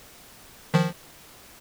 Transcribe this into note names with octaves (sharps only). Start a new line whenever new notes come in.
D#3 F3